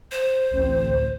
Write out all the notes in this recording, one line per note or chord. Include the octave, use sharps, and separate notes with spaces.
C5
A1 D2 C4